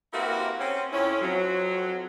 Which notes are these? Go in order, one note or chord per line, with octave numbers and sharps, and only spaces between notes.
A#3 C4 E4 F#4 G4 B4
C4 C#4
F2 C#4 E4
F2 F#3